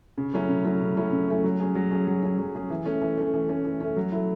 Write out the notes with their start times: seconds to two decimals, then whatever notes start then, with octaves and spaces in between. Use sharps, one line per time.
0.18 C#3
0.34 F#3 A3 C#4 E4
0.49 C#3
0.64 F#3 A3 C#4 E4
0.81 C#3
0.96 F#3 A3 C#4 E4
1.12 C#3
1.28 F#3 A3 C#4 E4
1.44 F#3
1.60 C#4 G#4
1.75 F#3
1.91 C#4 G#4
2.07 F#3
2.23 C#4 G#4
2.38 F#3
2.55 C#4 G#4
2.70 E3
2.86 A3 C#4
3.02 E3
3.18 A3 C#4
3.34 E3
3.49 A3 C#4
3.65 E3
3.81 A3 C#4
3.96 F#3
4.12 A3 E4